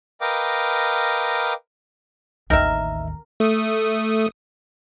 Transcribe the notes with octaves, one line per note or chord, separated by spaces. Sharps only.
A#4 B4 D#5 F5 G5 D6
A1 D#2 D#4 A#4 E5
A3 D#6